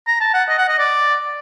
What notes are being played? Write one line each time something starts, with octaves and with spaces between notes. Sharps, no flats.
A#5
A5
F#5
D#5
F#5
D#5
D5